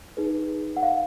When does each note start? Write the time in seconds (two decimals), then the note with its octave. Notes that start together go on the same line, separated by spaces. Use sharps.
0.17 D#4 G#4 B4
0.77 F#5
0.83 F5